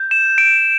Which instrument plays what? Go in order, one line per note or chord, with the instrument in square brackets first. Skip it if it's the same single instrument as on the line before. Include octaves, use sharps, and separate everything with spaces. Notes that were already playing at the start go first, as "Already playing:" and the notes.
Already playing: [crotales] G6
E7
D7